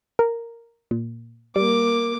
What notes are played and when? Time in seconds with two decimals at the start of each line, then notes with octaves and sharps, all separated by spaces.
0.19 A#4
0.91 A#2
1.56 G3 A#3 D6